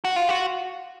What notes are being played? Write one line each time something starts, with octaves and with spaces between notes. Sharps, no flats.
F#4
F4
F#4